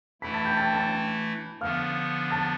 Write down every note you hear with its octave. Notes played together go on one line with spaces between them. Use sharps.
E3 A3 E4 B5 B6
A5 A6
G5 G6
A5 A6
A5 A6
D3 F3 B3 F5 F6
A5 A6